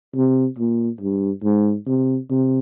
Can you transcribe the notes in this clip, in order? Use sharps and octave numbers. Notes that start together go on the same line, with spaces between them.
C3
A#2
G2
G#2
C3
C3